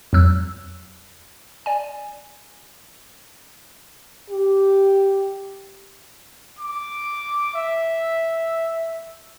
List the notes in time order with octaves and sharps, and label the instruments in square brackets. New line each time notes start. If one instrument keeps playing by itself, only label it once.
[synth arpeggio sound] F2 F#3 E6 F#6
D5 G#5
[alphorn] G4
[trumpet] D6
E5